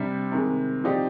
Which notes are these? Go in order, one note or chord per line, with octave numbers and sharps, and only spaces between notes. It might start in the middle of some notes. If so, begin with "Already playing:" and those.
Already playing: C3 G3 D4
C3 D#3 G#3
F3 C4 D#4 G4 D5